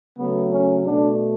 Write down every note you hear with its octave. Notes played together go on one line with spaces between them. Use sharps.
C#3 F#3 A3 B3
C#4
B2 A3 D4